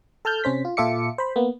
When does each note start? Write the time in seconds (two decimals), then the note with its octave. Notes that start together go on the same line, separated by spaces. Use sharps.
0.25 A4 A5 F6 G6
0.44 C3 C#4 C5 B6
0.65 F4
0.77 A#2 F4 A4 E5 D6 C#7
1.18 C5 B5
1.36 A#3 B3